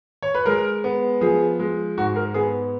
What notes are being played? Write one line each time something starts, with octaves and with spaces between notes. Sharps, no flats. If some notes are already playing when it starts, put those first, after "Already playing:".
C#5
B4
G#3 A#4
B3
F3 G#4
G#3
G#2 F#4
A#4
B3 G#4